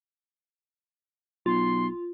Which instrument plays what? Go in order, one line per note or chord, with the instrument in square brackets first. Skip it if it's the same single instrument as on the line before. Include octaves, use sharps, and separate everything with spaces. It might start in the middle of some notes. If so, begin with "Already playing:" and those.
[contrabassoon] B1 [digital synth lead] F4 [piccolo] C6